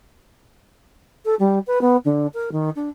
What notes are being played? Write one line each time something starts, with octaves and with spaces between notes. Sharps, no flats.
A4
G3
B4
B3
D3
A#4
D#3
D4